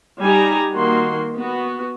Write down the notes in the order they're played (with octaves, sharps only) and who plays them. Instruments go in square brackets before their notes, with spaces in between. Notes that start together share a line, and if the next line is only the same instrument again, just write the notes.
[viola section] G3 D#4 G4 G#5 A#5
D#3 A#3 F#4 C6
B3 F#4